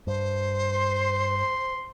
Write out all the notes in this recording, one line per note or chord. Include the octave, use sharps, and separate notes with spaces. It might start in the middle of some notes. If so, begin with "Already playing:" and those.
G2 C5
C6